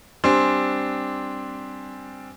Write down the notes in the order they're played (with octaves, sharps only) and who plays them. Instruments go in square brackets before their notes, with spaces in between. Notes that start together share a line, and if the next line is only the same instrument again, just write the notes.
[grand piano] G3 C4 D4 G#5 C6